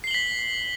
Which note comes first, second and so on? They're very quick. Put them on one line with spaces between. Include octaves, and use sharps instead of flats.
C7 G7 F#7 B6